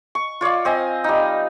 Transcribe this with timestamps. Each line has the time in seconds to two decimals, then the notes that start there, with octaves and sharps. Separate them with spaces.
0.15 C#6
0.41 F4 C#5 D5 F5
0.65 C4 D#5 G#5
1.04 G3 D#4